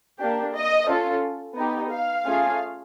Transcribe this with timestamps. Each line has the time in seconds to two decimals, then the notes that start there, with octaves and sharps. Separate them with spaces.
0.20 A#3 D4 G4
0.55 D#5
0.88 C#4 F4 A4
1.56 B3 D#4 G4
1.92 F5
2.25 A3 C#4 F4 G#4